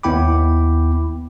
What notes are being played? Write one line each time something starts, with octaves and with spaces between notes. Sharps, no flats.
D#2 B3 E4 G5 B5 D6